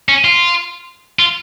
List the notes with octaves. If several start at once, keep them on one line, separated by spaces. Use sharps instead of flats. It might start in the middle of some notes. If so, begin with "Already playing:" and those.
C#4
F4
F4